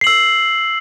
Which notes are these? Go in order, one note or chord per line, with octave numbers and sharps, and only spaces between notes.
E6 C7 F#7